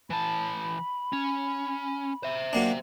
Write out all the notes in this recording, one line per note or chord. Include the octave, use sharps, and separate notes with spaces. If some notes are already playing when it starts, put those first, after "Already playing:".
E3 A5 B5
C#4
C5 E5
F#3 A#3 D4